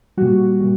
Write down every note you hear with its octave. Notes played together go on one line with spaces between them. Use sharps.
A#2 G3 F#4
A#2 G3